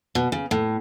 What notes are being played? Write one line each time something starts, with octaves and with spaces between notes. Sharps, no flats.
B2
C#3
A2